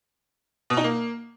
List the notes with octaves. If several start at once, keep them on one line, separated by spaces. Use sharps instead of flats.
B2
D#4
A#3